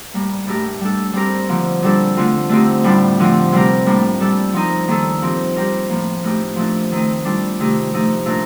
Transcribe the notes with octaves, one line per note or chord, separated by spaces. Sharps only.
A2 G3 A#3
A2 A3 D4 G4 A#4
G3 D4 A4
G3 C4 G4 A#4
D3 F3 A#3
A#2 G3 D4 A4
D3 A3 C4 F4
D3 A3 C4 D#4 G4
A2 G3 D4 F4
D3 F3 A3 C4
C3 G3 C4 G4 A#4
A2 G3 A#3 D4
G3 D4 A4
F3 C4 D#4 A#4
D#3 G3 A#3 F4 A4
A#2 F3 C4 G4 A#4
G3 C4 G4 A#4
A2 F3 A#3
A2 A3 D#4 G4
A#2 F3 A3 D4
D#3 A3 C4 D#4
G3 D4 F4 A4
C3 D#3 A3 D#4 G4
F3 A3 D#4 G4
A#2 A3 D4 A#4